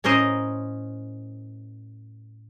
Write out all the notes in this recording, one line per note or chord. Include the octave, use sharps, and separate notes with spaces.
A2 C#4 A#4 C5 D#5